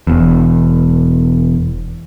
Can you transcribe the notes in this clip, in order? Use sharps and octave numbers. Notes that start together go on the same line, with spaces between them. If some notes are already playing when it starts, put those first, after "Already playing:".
E1 E2